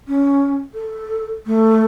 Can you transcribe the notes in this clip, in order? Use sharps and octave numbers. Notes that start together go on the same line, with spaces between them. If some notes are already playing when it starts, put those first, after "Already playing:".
C#4
A4
A3